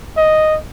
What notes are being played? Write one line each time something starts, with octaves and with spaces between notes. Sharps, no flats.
D#5